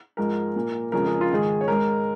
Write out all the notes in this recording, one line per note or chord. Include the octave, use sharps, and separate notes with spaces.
G#2 F3 G#3 A#4
A#2 A#3
F2 C#3 F3 G#3 A#4
G#4
F4
G#2 D#3 G#3 G#4
C#5
G#2 G#3 A#4